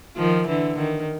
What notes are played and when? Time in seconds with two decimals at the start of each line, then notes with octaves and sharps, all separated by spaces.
0.17 D#3 F3
0.47 D3 E3
0.77 D#3